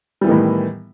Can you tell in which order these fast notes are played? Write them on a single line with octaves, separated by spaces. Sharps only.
G3 E3 B3 D#3 A2